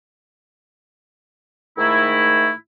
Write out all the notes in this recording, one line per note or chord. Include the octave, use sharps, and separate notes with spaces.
G#2 D#3 A3 D#4 E4